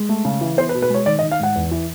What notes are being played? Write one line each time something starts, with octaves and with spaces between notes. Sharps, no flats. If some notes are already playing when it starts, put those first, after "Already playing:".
Already playing: G#3
A3
C#3
E3
B3 C5
B4
B2
B4
G#3 C#5
D#3 D5
D#5
D#3
F5
G#2 F#5
E2
E3